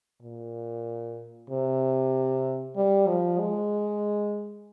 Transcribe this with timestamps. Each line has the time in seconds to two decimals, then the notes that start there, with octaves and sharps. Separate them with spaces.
0.22 A#2
1.50 C3
2.76 G3
3.08 F3
3.40 G#3